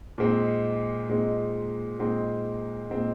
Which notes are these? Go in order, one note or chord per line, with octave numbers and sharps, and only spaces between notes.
A#2 G#3 C4 D#4
A#2 G#3 C4 D#4
A#2 G#3 C4 D#4
A#2 G#3 C4 D#4